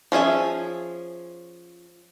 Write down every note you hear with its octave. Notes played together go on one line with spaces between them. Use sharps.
F3 C#4 G#4 E5